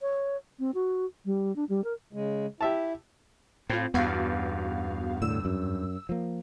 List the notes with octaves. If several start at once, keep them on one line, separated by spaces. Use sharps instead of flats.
C#5
C4
F#4
G3
D4
G3
A#4
C#3 G#3
E4 G4 E5 A5
A2 C4 F4
E2 G2 B3 F#4 F5
A2 D3 E6
F#2
F3 A#3